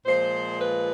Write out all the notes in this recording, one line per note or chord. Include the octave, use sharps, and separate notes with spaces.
A#2 F3 G#3 C5
B4